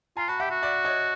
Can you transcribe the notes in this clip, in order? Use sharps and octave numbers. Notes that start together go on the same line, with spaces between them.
F4 G#5 A#5
F#4 A5 B5
G4 E5 F#5
F#4
D5 E5
C#5 D#5